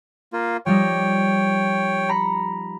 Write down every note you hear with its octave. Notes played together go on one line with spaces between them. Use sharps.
A#3 F4
F3 G3 D#4 C#5 G5
A#5 B5 C#7